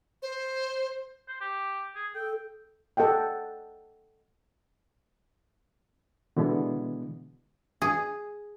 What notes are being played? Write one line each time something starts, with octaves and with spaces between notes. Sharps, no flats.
C5
C5
G4
G#4
A4 G5
A4 D#5 F#5 G5
B2 D3 E3 G#3 B3
G#4